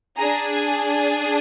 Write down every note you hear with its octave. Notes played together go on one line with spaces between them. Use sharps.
D4 G#4 A#5
G#5